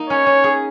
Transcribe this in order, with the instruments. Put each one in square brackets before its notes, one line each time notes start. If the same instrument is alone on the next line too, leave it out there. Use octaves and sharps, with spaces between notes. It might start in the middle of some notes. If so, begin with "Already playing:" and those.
Already playing: [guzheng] A#3 D#4
[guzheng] C#4 [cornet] C#5
[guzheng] C#4
G#4